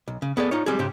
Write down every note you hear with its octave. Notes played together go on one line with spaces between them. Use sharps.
B1
C#3
B3 G#4 A4 D5
D#4 F4 C#5
G3 G#3 C4 G#4
G#2 C#3 G4 C5